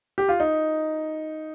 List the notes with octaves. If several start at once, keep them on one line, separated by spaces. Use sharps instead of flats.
G4
F4
D#4